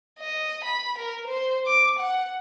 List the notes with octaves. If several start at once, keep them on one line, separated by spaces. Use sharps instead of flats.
D#5
B5
A#4
C5
D6
F#5